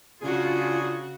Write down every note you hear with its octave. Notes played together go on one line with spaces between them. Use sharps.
C#3 C#4 D4 F4 F#4 G#4